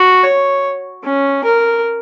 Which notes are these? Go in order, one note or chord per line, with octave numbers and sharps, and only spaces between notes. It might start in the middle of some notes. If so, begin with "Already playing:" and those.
Already playing: F#4
C#5
C#4
A#4